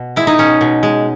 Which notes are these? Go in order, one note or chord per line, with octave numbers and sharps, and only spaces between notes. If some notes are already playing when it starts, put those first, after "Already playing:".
Already playing: B2
G#3 E4
D#4
B2 C#4
B2
G#3